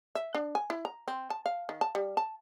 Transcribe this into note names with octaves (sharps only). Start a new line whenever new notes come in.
E5
D4
G#5
E4
A#5
C4
A5
F5
D#3
A5
G3
A5